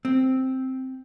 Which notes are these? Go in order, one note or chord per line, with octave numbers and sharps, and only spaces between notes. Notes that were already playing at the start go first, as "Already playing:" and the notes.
C4